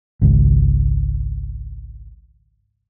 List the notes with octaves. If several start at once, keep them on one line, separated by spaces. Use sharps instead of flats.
G#1 C#2